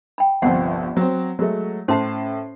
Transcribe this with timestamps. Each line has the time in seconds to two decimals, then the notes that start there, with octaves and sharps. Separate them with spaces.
0.18 G5 B5
0.42 G1 C2 F3 F#5
0.97 F#3 C4
1.39 F#3 G#3 A3
1.88 A2 C#4 C5 A5 C6 C7